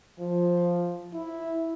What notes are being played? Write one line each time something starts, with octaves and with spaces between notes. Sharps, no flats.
F3
E4